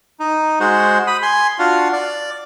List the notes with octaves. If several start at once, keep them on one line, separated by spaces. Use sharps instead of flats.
D#4
G#3 F#4 C5
B5 D#6
G#5 C6
D4 F4 F#4
D5